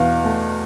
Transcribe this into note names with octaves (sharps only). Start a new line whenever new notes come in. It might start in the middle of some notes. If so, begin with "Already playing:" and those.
Already playing: E2 B2 F5
A3